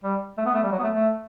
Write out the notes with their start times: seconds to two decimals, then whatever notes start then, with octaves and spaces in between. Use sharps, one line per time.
0.03 G3
0.38 A3
0.46 B3
0.54 A3
0.63 G3
0.72 F#3
0.79 B3
0.83 A3
0.94 A3